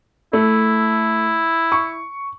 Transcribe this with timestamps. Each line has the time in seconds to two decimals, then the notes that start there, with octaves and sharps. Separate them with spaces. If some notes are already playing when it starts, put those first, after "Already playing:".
0.33 A3 E4
1.72 C#6